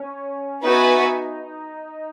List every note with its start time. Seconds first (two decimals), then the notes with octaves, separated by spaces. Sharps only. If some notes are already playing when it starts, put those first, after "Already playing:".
Already playing: C#4
0.62 B3 D#4 F#4 B4 E5 G#5